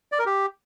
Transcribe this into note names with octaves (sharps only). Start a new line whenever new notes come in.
D5
A#4
G4